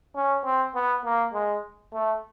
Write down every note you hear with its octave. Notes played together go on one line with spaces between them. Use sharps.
C#4
C4
B3
A#3
G#3
A3